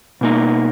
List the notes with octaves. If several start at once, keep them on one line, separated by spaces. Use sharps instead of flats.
B2 A#3 D#4